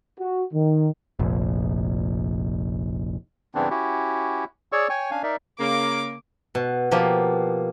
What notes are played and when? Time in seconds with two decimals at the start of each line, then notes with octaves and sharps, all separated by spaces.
0.19 F#4
0.54 D#3
1.19 F1 A#1
3.55 G2 C#3 E3 B3 C4 D4
3.70 C#4 E4 F#4 G4
4.72 G#4 C#5 D5 C#6 E6
4.89 C#5 G5 G#5 C#6
5.11 C#4 D4 F5 G#5
5.23 D#4 A#4 D5 E5
5.60 C#3 A#3 D6
6.55 B2
6.91 B2 F3 A#3 G4